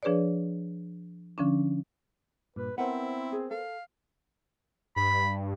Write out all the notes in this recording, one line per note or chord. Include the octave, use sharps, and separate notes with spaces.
F3 D4 G#4 B4 C#5 D5
D3 F3 C#4 D4
G2 A#2 B4
B3 C4 E4 A#4 C5 F#5
G#4
A4 F5
G2 B5